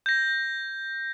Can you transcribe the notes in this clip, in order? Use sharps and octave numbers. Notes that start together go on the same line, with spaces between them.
G6 A#6